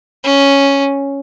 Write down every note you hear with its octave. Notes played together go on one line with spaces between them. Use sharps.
C#4